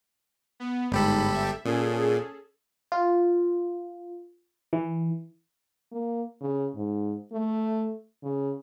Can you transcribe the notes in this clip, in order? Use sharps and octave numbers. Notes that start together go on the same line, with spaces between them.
B3
G1 G#2 G4 A4 B5
E5
A#2 C#4 G#4 A4
F4
E3
A#3
C#3
G#2
A3
C#3